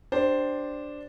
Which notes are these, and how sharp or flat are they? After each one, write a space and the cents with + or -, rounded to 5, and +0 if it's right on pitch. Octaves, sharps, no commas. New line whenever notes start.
D4 +0 G4 +0 C5 +0